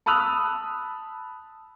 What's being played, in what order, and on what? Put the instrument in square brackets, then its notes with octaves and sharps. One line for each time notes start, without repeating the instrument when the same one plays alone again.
[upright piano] A5 B5 D#6 E6 F#6 F7